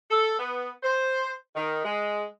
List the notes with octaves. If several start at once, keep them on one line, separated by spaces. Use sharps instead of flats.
A4
B3
C5
D#3
G#3